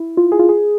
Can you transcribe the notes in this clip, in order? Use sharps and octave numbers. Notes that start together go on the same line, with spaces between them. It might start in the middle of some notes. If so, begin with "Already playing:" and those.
Already playing: E4
F4
G#4
F4
G#4